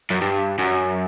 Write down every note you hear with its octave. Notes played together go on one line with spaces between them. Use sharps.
F#2
G2
F#2